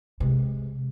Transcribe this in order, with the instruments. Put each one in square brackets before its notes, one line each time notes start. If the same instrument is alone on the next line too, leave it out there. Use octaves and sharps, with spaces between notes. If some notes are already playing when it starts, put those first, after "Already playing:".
[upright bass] C3 G#3